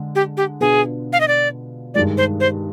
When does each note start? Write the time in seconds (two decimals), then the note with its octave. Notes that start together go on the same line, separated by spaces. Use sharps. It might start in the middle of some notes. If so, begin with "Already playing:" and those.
Already playing: D3 G#3
0.15 G4
0.37 G4
0.60 B2 B3 D4 F4 G#4
1.13 F5
1.20 D#5
1.28 D5
1.94 G2 D#3 G#3 D5
2.17 C5
2.40 C5